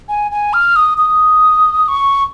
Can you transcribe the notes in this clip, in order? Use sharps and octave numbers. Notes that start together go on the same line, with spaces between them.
G#5
G#5
F6
D#6
D#6
C#6